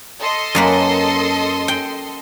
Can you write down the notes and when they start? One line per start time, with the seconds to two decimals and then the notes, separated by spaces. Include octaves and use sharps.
0.20 A4 D#5 C6
0.55 F#2 A#3 B4
1.68 G5